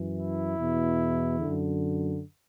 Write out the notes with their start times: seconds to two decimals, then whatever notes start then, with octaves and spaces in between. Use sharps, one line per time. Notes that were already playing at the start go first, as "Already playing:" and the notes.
Already playing: F#2 E3
0.17 E4
0.58 E2 B2
1.40 F#2 D3